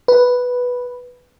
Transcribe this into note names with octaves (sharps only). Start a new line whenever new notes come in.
B4